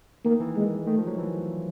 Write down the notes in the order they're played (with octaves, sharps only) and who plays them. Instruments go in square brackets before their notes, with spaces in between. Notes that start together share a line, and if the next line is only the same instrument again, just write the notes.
[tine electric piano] D#3 [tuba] A#3
[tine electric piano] E3
[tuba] G#3
[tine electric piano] D#3 [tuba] A3
[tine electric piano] F3
F#3
E3